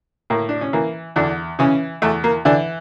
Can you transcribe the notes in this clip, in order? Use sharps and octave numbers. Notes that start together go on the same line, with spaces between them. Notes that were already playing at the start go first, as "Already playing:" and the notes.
A2 A#3
D4
C#4
E3 A#3
E2 D3 D4
C#3 E3 C#4
E2 A3
A#3
D3 E3 D4